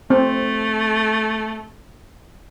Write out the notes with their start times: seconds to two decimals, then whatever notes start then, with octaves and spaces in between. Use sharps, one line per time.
0.10 A3 C4